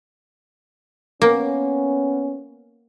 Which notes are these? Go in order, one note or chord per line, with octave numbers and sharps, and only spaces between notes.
A#3 B3 C#4